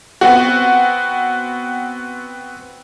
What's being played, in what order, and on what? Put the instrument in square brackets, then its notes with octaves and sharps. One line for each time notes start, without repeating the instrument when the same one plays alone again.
[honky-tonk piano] B3 C4 F#4